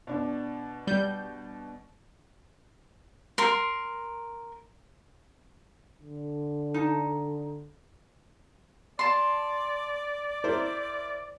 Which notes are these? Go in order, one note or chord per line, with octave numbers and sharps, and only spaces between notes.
B2 D4
G3 G6
A#4 C6
D3
D#4 A5
D5 A5 C6
E4 A#4 C5